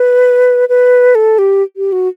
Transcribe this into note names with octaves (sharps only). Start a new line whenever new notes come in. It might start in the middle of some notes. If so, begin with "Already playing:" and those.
Already playing: B4
B4
A4
G4
G4
F#4